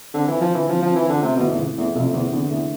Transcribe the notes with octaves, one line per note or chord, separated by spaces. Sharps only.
D3 C4
E3 F4
F3
D3 E3
F3 C4
F3 C4
E3
D3 F4
C3 A3
B2
E3
E2
E3
E2 A3
F2 C3
E2 E3
E2 D3
E2 A3